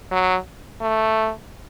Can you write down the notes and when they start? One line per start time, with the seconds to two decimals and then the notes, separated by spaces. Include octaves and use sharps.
0.12 F#3
0.81 A3